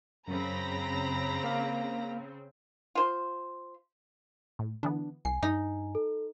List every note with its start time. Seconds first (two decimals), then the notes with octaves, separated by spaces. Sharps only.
0.28 F#2 C#3 C4 A#5 B5 A#6
1.44 A#3 F5
2.95 F4 C5
4.59 A2
4.83 D3 E3 B3 D4
5.25 C2 G#5 C7
5.43 G2 D#4
5.95 A4